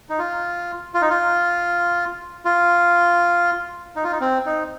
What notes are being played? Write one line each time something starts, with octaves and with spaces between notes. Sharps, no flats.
D#4
F4
F4
D#4
F4
F4
D#4
F4
D#4
C4
D#4